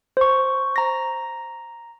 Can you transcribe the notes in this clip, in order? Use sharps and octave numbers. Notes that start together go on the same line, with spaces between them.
C5 C#6
A#5 A#6